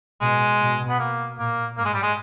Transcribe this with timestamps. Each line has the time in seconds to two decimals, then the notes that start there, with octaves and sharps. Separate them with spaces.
0.21 B2 G#3
0.61 B2
0.89 B3
0.99 A#3
1.38 A#2 A#3
1.77 G#2 A#3
1.85 G#3
1.94 G3
2.03 G#3